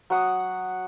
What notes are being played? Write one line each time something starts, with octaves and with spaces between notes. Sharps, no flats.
F#3 F#5 D#6